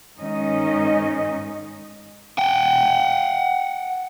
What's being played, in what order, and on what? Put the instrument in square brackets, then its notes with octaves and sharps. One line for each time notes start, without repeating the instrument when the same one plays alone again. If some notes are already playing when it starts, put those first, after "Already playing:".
[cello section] G#2 D#3 C#4 D#4 D#5
[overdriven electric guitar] F#5 G5